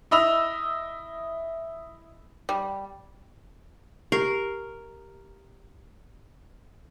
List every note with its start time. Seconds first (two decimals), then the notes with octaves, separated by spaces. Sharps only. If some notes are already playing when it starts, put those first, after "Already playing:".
0.11 E4 D#5 B5 E6 F6 F7
2.49 G3
4.12 G4 A#4